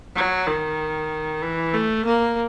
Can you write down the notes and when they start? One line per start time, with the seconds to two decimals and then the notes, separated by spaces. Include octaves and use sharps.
0.16 F#3
0.47 D#3
1.42 E3
1.73 A3
2.05 A#3